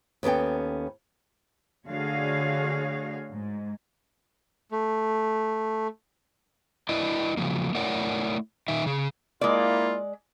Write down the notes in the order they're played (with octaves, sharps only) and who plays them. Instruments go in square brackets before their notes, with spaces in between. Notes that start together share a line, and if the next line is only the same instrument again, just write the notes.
[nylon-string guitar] D#2 B3 C#4 A4 G5
[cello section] D3 A3 F#4 G#4 C#5 F5
G#2
[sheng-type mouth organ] A3
[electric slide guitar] E4 B4 D5 D#5
C#3 F3 F#3 A#3
A3 E4 A#4 C#5 D5 F#5
A#2 D#3 D#4 E5
C#3 G#4
[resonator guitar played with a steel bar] G#3 D5 [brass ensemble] A#3 E4 F4